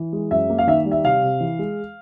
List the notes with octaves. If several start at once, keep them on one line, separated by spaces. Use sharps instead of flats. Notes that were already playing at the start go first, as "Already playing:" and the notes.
Already playing: E3
G#3
F#2 E5
A#3
F5
D#3 E5
G3
E5
C3 F5
C3
E3
G#3